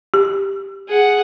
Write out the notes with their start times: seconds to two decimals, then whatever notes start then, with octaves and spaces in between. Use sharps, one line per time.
0.14 G4
0.89 G#4 F#5